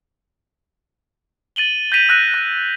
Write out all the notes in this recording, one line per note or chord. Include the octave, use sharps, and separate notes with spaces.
A6 D#7 F#7 G7
G6 A#6 B6 D#7 F7
E6 F#6 A#6 D#7
F#6 D#7